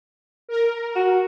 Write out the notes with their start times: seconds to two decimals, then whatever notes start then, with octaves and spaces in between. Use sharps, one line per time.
0.49 A#4
0.96 F#4